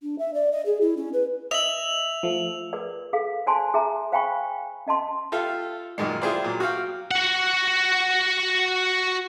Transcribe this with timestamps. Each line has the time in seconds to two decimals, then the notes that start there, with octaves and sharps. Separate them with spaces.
0.02 D4
0.18 E5
0.33 D5
0.52 D#5
0.65 G#4
0.81 E4
0.96 C#4
1.13 B4
1.51 D#5 E5 F7 F#7
2.23 F3 A3
2.73 G#4 A#4 B4 D5
3.13 G#4 A4 F5
3.47 C5 D5 G#5 A5 C6
3.74 G#4 E5 A#5
4.12 C5 F5 G5 G#5 B5 C#6
4.87 C#4 D#5 A5 C6
5.32 F4 G4 A4 E5 F5
5.98 F#2 A#2 D#3 G#3
6.22 E4 F4 G4 G#4 C5 D5
6.44 A#2 F#3
6.60 F#4 G4 F5 G5
7.11 F#4 F#5